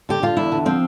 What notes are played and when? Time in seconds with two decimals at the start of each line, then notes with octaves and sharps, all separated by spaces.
0.09 D3 G4
0.22 D3 F4
0.37 E2 E4
0.52 D3
0.65 F3 C4